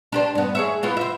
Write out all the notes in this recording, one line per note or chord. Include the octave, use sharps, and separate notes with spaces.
D4 G4 C5
G2 B3
G#4 C#5 E5
B3 E4 F4
C5 E5